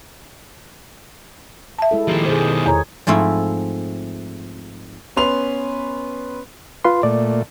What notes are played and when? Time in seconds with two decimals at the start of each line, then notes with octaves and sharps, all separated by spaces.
1.79 E5 A5
1.91 G#3 E4 A4
2.08 D#3 F3 A#3 G4
2.26 B2 D#3 G#4 C5
2.66 E2 G#4 C#5 A#5
3.07 G#2 F3 A3 C4 E4
5.16 B3 C#4 B4 C6 F7
6.84 F4 B4 C6
7.03 A#2 A3 D5